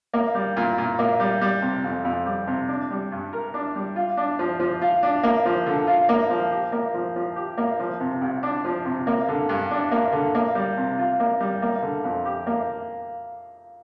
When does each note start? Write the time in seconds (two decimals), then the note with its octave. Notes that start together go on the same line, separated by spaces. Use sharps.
0.14 A#3
0.35 G3
0.57 A#2
0.78 A#2
0.99 A#3
1.20 G3
1.41 G3
1.62 C3
1.84 F2
2.05 F2
2.26 G3
2.47 C3
2.68 D4
2.90 G3
3.12 G2
3.33 A#4
3.54 D4
3.75 G3
3.96 F4
4.17 D4
4.39 F3
4.59 F3
4.81 F4
5.03 D4
5.23 A#3
5.45 F3
5.66 D3
5.87 F4
6.09 A#3
6.30 F3
6.51 G4
6.72 A#3
6.94 F3
7.16 F3
7.36 G4
7.58 A#3
7.79 F3
8.00 C3
8.21 C2
8.43 D4
8.64 F3
8.85 C3
9.07 A#3
9.28 D3
9.49 G2
9.71 D4
9.91 A#3
10.12 D3
10.35 A#3
10.55 G3
10.77 C3
10.98 F4
11.20 A#3
11.40 G3
11.62 A#3
11.82 D3
12.04 F2
12.25 G4
12.47 A#3